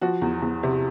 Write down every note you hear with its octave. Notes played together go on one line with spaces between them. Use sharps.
F3 F#4
E2
E2
C3